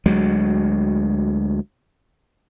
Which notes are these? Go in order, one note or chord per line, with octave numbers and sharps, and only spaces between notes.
D2 F#3 G#3